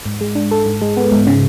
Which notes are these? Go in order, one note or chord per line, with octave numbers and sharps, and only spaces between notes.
G#2
G#3
D4
A4
G#2
G#3
B3
G#2
C#3